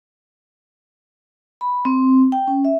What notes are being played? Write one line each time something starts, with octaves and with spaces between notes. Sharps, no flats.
B5
C4
G5
C#4
E5